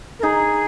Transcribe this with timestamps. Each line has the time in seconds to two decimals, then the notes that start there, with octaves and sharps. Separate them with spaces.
0.19 A#4
0.23 D#4 G#4